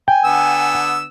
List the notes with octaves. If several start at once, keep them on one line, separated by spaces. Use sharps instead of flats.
G5 G#5
D3 B3 E6